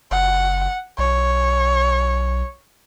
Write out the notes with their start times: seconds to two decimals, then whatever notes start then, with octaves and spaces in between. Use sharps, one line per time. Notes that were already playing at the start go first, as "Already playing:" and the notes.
0.11 F#1 F#5
0.98 B1 C#5